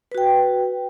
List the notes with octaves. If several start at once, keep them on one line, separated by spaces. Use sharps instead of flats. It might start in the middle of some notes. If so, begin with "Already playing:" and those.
F#4 B4 G5